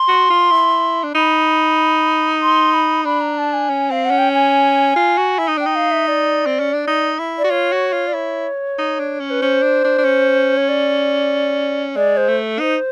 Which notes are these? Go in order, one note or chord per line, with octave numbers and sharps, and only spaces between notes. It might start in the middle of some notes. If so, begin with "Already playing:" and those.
Already playing: C6
F#4
F4
E4
D4
D#4 B5
C6
B5
D4 B5
A#5
A5
G#5
C#4
C4 F5
F#5
C#4
G5
G#5
F4
F#4
E4
D#4
D4 G5
D#4
F5
E5
D5
C4
C#4
D4
D#4
E4
D5
F#4
F4 C#5
F#4
F4
D5
E4 C#5
D#4
D4
C#4
B4
C#4 C5
D4
D4
D4
C#4
C#5
D5
G#3 D5
C5
A3
D#4 C5